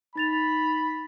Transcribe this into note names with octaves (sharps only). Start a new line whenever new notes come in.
D#4 B5 A6 F7